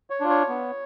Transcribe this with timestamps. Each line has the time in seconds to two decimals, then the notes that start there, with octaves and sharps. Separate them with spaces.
0.10 C#5
0.21 D4 F4
0.30 C#5
0.49 B3